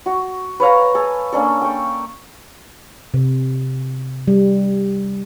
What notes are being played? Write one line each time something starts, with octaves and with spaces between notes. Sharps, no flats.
F#4
B4 C#5 F5 A#5
A4 G#5
A#3 C#4 D4 A4
G5 C#6
C3
G3